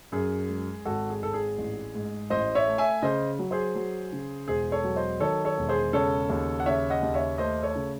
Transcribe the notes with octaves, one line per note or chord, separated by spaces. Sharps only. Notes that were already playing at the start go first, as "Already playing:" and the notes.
F#2 G#4
G#3
G#1 F#4 A4
G#4
G#1 A4
G#4
A1
G#2
A1 C5 D#5
C#5 E5
A3
E5 G#5
C#3 C5 D#5
F#3
G#4 C5
F#3
C#3
E1 G#4 C5
A4 C#5
F#3
C5 D#5
D#3 A4 C#5
A4 C#5
E1
G#4 C5
C#3 A4 C#5
D#2
F#5
C#3 C#5 E5
D#5 F#5
D#2
C#5 E5
A3 C5 D#5
A4 C#5
C#3